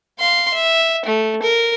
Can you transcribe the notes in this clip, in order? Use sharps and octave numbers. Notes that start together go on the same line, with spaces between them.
F5 C6
E5
A3
A#4